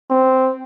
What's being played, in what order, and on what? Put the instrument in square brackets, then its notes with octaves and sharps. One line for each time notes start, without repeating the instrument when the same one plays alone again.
[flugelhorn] C4